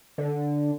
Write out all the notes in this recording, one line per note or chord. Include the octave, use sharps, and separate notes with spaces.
D3